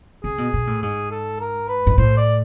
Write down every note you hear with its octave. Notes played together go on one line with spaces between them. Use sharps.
C3 G#4
B2
B2
A2
G#2 G#4
A4
A#4
B4
G#2
A2 C5
D5